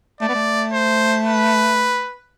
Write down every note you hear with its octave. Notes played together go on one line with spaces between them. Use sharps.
A3 D5
B3
A3
C5
B4